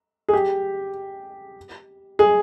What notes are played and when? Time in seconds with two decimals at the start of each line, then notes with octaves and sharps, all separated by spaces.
0.29 G#4
0.33 G4
2.19 G#4